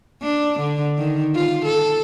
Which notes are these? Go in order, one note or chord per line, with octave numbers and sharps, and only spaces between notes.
D4
D3
D#3
F4
A4